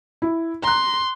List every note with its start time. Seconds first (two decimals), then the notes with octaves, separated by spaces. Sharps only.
0.22 E4
0.63 A#5 C6 F#6